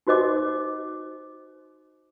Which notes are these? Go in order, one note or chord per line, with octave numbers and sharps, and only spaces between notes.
D#4 F#4 C5 D#5 D6